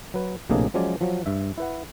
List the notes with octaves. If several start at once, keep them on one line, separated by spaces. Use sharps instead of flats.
F#3 B4
A#1 A2 C3 A#3 D4 G#4
F3 F#3 G#3 C#4 C#5 D5
F3 F#3
G2 E5
E4 B4 F#5